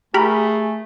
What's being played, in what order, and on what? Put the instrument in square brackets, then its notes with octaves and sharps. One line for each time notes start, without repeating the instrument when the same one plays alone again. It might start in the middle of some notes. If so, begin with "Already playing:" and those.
[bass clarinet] A3 [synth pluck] G4 A#4 B5 [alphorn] G#4